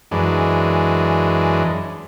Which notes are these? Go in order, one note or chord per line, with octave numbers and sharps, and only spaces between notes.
F#2 E3 G#3 D4